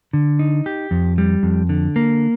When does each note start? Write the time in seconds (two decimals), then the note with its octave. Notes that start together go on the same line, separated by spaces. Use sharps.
0.13 D3
0.39 D#4
0.66 G4
0.91 F2
1.18 G3
1.43 F2
1.69 D3
1.96 A#3